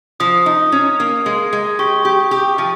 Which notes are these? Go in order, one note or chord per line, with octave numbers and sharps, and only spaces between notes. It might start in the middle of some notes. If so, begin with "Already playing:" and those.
F3 D#6
D#4
C#4
A#3
G#3
G#3
G4 C#6
G4
G4
F3